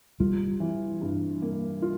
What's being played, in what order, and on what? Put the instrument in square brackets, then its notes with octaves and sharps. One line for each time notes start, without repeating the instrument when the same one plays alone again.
[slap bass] G3 [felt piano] F4
[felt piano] E3
G2
A#3
F4